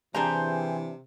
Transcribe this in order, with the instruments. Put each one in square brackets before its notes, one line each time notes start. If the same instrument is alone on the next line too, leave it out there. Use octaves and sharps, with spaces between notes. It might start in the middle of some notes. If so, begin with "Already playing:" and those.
[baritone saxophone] C3 [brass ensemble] E3 [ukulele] D4 A#5 [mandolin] G4 G#4 C5